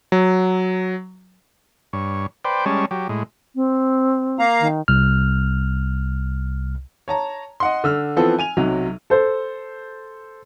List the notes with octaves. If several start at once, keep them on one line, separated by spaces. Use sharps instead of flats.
F#3
G2 C#5
B4 C5 D5 G5
G3 G#3 C#4 C#5 A5
F#3 G4
A2 G#3
C4
A#3 F5 A#5
D#3
C2 F6
C#5 A5 A#5
D#5 F#5 C6
D3 E6 F6
E3 F3 B3 C4 A4
G#5 D#7 F7
B1 C3 F#3
A4 C5